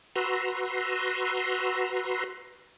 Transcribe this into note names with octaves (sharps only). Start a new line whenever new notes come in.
F#4 B4 A#5 C6 E6